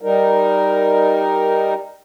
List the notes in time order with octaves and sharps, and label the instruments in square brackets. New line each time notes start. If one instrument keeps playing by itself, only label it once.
[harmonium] G3 D#4 A#4